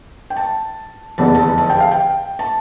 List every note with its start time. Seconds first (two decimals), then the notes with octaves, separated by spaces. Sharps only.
0.30 G5
0.36 A5
1.18 F1 E2 D3 A5
1.35 A5
1.58 A5
1.70 G5
1.80 F5
1.91 G5
2.39 A5